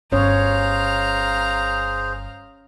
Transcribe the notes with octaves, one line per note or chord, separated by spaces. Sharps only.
G1 C#4 G#4 C5 C#5 F5 A#5